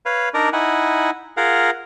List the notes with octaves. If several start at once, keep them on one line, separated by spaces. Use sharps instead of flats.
B4 C#5 F5
D4 D#4 A#4 D5
D#4 E4 F#5 G#5
F4 G#4 A#4 F5 F#5